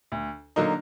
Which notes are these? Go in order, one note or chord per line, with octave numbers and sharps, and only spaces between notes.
D2
D3 F#3 A#3 D#4